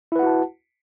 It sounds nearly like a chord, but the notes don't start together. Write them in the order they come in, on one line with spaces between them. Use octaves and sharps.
E4 B4 F#5 F#4 A5